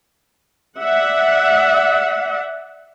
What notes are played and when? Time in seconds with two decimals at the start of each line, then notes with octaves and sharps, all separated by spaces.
0.78 D5 E5 F#5